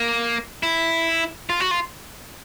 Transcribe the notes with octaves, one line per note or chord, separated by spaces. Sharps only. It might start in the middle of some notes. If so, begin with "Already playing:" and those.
Already playing: A#3
E4
F4
F#4
F4